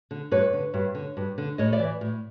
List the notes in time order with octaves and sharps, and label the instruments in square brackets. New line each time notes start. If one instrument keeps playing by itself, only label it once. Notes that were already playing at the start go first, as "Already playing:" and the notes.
[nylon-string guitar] D3
G2 B4 C#5
D3
G2
D3
G2
D3
A2 C#5 D#5
D5 E5
E3
A2